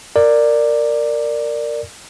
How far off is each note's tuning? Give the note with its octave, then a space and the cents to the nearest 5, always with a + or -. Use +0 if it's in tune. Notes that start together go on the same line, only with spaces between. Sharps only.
A#4 -15 D5 +10